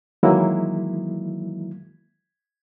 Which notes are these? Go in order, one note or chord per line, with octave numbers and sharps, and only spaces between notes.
D#3 E3 F#3 G#3 A#3 E4